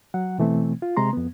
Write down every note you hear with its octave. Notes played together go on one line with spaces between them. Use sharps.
F#3 F#5
B2 E3 A3 C4
F4
C3 G#3 A#5 C6
F2 B3